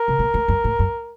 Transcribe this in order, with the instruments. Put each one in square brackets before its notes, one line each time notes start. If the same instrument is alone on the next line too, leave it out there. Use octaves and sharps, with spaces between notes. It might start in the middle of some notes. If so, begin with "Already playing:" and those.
Already playing: [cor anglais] A#4
[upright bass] C3
A#2
A2
F#2
A2
F#2